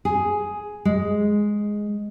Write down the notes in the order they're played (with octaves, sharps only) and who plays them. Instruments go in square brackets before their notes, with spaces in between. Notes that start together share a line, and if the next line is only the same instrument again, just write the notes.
[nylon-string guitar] G#4
G#3